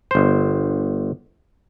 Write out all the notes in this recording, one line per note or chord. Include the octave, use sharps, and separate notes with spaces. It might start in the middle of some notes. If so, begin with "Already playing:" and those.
G1 C5